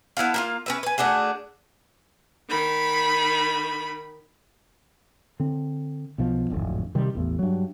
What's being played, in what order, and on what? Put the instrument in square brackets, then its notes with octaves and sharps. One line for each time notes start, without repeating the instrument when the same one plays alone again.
[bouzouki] B3 E4 A4 F5
A#3 E4 F4
C#4 B4 E5
B4 G#5
A3 D4 F#4 G#4
[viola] D#3 B5
[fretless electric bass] D3 C4
B1 B2 F3
D1 G#1 F2
C3 D#3 G3
A1 E2
G2 F#3